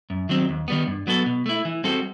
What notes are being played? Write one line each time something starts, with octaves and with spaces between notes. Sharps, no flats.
F#2
D#3 F#3 C4
D#2
D#3 G3 B3
G2
F#3 B3 F#4 A4
B2
A3 E4
E3
G3 C4 F#4 A4